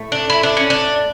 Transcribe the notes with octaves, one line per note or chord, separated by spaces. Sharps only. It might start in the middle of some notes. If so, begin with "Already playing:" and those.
Already playing: A2 A3
D4
E4
D4
C#4
D4